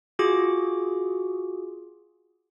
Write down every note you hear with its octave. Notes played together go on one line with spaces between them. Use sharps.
F4 F#4 G#4 D6